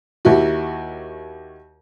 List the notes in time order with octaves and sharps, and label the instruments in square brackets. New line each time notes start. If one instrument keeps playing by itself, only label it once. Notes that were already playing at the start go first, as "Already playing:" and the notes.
[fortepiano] D#2 E4 F#4